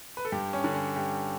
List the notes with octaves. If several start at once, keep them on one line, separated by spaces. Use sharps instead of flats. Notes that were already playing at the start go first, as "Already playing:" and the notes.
B4
A4
G2 G4
C#4
D3
C#4
G2 G4